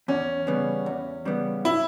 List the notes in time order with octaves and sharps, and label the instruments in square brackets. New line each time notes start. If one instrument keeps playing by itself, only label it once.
[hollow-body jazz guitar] E2 [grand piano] C#4
[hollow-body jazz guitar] C#3 G3 B3
E2
C#3 G3 B3
[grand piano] E4